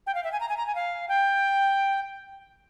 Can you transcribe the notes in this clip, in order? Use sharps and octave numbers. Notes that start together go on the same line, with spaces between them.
G5
F5
E5
G#5
A#5
G#5
A#5
G#5
F5
G5